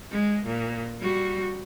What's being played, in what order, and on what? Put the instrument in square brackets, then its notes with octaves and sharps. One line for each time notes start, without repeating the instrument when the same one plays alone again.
[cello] G#3
A#2
G3 F#4